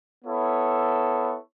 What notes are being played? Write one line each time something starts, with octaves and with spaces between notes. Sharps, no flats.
B3 E4 A4 C#5